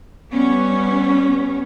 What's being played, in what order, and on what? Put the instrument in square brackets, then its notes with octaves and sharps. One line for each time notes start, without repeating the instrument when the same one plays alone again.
[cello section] G3 B3 C#4